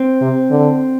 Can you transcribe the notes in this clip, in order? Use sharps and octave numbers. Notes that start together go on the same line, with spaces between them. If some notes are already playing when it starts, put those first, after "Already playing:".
Already playing: C4
C3
D3